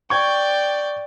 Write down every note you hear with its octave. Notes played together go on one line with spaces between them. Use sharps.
D5 G5 C#6 G#6